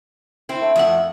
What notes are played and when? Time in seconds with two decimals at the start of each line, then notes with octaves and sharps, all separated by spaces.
0.49 C4 E4
0.61 A3
0.76 F2 E5 F#5